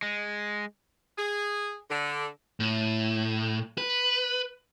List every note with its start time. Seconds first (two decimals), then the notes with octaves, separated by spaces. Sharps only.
0.02 G#3
1.18 G#4
1.90 D3
2.60 A2
3.78 B4